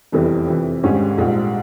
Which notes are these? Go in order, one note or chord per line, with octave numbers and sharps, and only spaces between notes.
F1 E2 C3 E3 G3
F2 C3 E3
G#1 G#2 G3 C#4 G4
A#1 G#2 G3